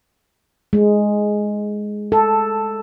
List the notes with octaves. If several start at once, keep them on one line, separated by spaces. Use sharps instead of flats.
G#3
A4